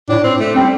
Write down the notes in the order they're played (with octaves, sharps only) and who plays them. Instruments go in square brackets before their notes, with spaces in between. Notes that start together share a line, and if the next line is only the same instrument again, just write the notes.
[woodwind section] A2 [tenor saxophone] D4
[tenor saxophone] C4
A3
[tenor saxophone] G3 [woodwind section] C4